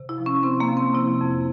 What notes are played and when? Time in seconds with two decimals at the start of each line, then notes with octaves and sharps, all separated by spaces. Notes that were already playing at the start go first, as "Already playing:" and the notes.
Already playing: C3
0.09 E4
0.18 F3
0.26 C#4
0.43 C3 C4
0.60 A#3
0.68 F3
0.77 C4
0.94 C3 E4
1.21 F2